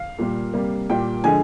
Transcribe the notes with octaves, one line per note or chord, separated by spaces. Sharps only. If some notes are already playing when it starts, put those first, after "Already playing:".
Already playing: F5
A#2 G3 A#3
C3 G3 A#3
A#2 G3 A#3 G5
D3 F3 G#3 G#5